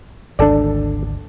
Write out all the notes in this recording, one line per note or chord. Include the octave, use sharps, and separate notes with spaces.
G#1 D2 D4 A4 D5